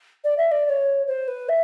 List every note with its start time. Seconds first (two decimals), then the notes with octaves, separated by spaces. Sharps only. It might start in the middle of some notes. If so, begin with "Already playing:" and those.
0.24 D5
0.38 E5
0.51 D5
0.65 D5
0.69 C#5
1.07 C5
1.28 B4
1.49 E5